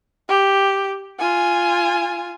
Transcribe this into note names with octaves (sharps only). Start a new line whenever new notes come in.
G4
F4 G#5